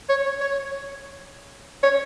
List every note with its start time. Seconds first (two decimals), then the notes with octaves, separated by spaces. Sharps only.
0.09 C#5
0.25 C#5
0.41 C#5
1.83 C#5